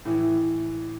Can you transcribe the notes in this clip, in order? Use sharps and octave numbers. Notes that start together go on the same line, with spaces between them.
A2 E3